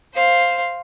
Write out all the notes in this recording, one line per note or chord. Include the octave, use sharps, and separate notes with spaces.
C5 F5